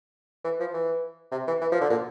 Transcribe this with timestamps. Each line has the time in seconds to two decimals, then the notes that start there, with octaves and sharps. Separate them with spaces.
0.44 E3
0.60 F3
0.74 E3
1.32 C3
1.47 E3
1.61 E3
1.72 F3
1.81 D3
1.90 A#2